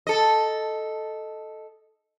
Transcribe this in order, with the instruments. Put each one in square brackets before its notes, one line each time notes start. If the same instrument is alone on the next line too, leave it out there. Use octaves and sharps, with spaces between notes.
[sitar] A4 D#5